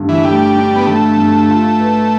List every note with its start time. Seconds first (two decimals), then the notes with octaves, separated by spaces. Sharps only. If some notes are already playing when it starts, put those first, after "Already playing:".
Already playing: G2 D3 A3 D4
0.09 E3
0.24 G3 A3
0.56 D4
0.76 B3
0.86 D3 A3
1.17 G2
1.49 F4
1.80 B4